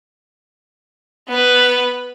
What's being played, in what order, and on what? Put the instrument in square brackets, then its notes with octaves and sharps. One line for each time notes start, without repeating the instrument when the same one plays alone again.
[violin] B3 B4